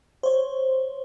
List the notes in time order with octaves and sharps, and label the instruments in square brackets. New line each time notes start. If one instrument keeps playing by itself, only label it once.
[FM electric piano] C5 C#5